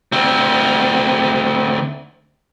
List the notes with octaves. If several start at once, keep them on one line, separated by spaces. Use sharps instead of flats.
D2 C4